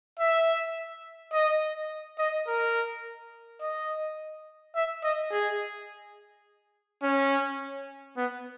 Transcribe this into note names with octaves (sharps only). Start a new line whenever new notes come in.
E5
D#5
D#5
A#4
D#5
E5
D#5
G#4
C#4
B3